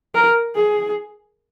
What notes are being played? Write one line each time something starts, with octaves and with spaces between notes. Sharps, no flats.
A#4
G#4